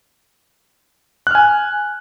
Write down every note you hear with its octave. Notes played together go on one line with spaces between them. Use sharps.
G#5 F6 F#6